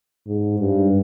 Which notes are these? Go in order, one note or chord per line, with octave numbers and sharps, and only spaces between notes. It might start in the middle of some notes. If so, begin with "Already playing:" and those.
G#2
G2